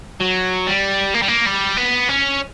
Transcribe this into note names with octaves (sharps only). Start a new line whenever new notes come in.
F#3
G3
A#3
G3
A#3
G3
B3
C#4